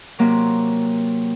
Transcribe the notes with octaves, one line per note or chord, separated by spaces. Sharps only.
C3 F#3 A#3